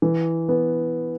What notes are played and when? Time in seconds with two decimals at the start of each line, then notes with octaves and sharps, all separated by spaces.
0.02 E3
0.49 B3